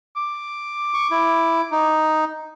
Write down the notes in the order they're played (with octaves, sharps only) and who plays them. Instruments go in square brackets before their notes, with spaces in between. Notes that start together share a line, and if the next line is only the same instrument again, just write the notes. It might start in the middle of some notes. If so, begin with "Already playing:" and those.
[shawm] D6
[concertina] C#6
E4
D#4